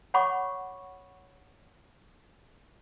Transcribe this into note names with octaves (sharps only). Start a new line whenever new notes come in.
C#5 F#5 B5 C#6 D6